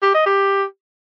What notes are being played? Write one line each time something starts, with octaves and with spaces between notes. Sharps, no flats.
G4
D#5
G4